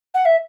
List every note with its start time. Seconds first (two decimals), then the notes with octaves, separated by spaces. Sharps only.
0.14 F#5
0.25 E5